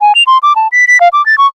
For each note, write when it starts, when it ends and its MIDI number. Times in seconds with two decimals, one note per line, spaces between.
0.01 0.13 80
0.15 0.23 101
0.27 0.38 84
0.43 0.53 86
0.56 0.68 81
0.72 0.85 95
0.88 1.00 95
1.01 1.08 77
1.13 1.24 86
1.26 1.38 93
1.38 1.47 85